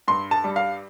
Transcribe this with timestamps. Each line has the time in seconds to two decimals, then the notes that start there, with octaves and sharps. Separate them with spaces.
0.08 G2 C6
0.31 A5
0.44 G3
0.56 F5